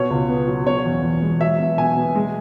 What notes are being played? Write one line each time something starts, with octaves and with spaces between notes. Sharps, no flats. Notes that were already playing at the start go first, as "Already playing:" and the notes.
Already playing: B2 C#5
C#2
B3
F#3
B2 C#5
E2
E2
G#3
F#3 E5
B2
B2 G#5
B3
G#3